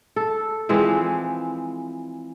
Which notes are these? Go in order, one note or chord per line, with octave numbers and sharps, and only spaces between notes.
A4
E3 F3 G#3 C4